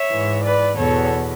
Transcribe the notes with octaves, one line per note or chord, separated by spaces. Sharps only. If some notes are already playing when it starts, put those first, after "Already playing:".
Already playing: C#5 E5
G#2 E3
B4 D5
E2 B2 A4 C#5